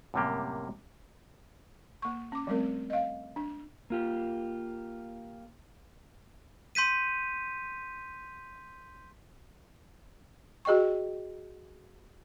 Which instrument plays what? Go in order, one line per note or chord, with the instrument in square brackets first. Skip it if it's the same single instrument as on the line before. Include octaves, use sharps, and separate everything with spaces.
[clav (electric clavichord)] F#2 A2 C3 G3 A#3 G4
[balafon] A#3 C#6
C#4 D6
F3 G3 A3 C4 A#4
D#5 F5
D4
[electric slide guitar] A#3 F4 G4
[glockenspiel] C6 G6 B6 D#7
[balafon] F#4 G#4 D#5 G5 C#6